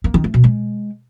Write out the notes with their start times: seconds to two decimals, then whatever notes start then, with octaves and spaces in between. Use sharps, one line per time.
0.04 A#3
0.14 D#3
0.24 A3
0.34 B2
0.44 G#3